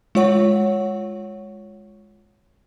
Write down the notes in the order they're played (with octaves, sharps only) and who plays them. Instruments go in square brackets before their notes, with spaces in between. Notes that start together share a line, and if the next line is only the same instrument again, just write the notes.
[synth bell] G#3 F4 C#5 F#5 C#6